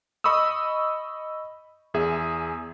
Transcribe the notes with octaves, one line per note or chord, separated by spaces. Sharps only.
D#5 B5 C#6 D#6 E6
E2 G#4 E5